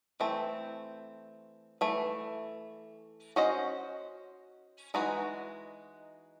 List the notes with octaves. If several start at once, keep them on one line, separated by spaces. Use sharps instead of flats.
E3 A3 C4
E3 A3
C#4 F#4 C5 D#5
E3 G#3 D#4 F#4